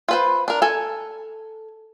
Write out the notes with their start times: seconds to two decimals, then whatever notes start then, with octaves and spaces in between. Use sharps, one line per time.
0.09 F4 B4 C5
0.48 D4 A#4
0.62 A4 G#5